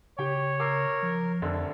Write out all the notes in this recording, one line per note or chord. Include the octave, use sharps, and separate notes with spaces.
C#3 G4 C#5 G5
A#4 D6 E6 C7
F3
F1 F2 D3